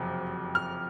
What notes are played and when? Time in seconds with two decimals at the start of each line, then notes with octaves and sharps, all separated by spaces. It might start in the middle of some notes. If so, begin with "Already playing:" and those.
Already playing: F#1 F2 C3 F#3
0.55 F6